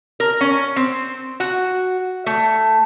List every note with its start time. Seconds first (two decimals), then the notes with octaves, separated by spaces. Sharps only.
0.20 A#4
0.41 C#4
0.76 C4
1.40 F#4
2.26 A3